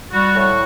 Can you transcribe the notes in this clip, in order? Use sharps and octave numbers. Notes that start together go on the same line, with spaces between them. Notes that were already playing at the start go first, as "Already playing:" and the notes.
G3 F#4
A2
F#4